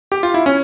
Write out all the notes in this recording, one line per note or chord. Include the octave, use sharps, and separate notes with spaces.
G4
F4
E4
C#4